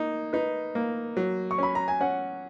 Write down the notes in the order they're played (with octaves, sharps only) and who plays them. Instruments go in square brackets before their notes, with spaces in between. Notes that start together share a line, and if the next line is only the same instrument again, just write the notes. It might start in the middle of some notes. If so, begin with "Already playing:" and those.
Already playing: [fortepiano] A#3 D#4
[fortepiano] D#4 [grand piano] B4
[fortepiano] A#3
F#3
[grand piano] C#6
[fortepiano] C#4 [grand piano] B5
[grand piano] A#5
G#5
[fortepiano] C#4 [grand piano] F#5